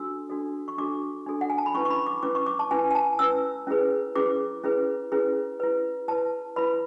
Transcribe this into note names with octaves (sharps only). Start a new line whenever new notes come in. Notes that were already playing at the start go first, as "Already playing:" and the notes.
Already playing: D4 F#4 A4 E6
D4 F#4 A4
C#6
D4 F#4 A4 D6
D4 F#4 A4
F#5
G#5
A5
B5
C#4 E4 B4 C#6
C#6
B5
D6
C#4 E4 B4 D6
C#6
D6
A5
C#4 E4 B4 G#5
G#5
A5
C#4 E4 B4 E6
C#4 E4 G#4 B4
C#4 E4 G#4 B4 D6
C#4 E4 G#4 B4
C#4 E4 G#4 B4
E4 B4
E4 B4 A5
E4 B4 B5